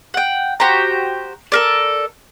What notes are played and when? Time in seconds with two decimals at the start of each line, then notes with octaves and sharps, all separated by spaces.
0.14 F#5 G5
0.60 F#4 G4 C5 A#5
1.52 A4 A#4 D5